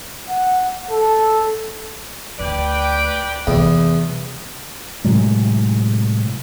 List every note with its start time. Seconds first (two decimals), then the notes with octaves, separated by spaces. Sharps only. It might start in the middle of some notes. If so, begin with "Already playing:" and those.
0.29 F#5
0.91 A4
2.40 D2 B4 D5 G5
3.47 E2 C3 G3
5.04 A2 C3 F#3 G#3